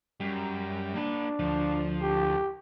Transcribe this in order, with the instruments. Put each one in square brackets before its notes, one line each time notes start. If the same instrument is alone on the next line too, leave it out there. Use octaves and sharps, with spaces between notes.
[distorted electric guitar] F#2 [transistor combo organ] G3
[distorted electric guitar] A#3 B5 [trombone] D4
[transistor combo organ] D2 [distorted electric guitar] F3
[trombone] G4